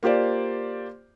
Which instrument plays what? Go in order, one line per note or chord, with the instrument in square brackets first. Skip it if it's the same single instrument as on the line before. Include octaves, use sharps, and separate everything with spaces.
[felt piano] A#3 F4 G4 C5 D5